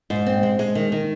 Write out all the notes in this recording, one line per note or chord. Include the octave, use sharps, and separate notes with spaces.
G#2
C4
G#3
G#3
D#3
D#3